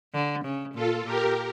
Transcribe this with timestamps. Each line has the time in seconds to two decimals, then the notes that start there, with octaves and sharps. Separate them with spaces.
0.14 D3
0.44 C#3
0.74 A#2 F4 A4
1.05 A#2 G4 A#4